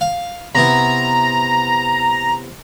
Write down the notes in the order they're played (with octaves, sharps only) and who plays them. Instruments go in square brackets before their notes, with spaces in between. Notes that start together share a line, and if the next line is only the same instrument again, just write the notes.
[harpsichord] F5
[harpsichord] C3 B3 E4 [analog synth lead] A#5